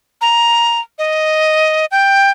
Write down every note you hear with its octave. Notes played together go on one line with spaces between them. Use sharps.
A#5
D#5
G5